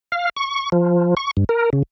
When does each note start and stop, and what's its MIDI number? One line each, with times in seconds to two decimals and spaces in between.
0.12 0.29 77
0.37 0.70 85
0.72 1.14 53
1.17 1.31 85
1.37 1.44 43
1.49 1.70 70
1.73 1.83 49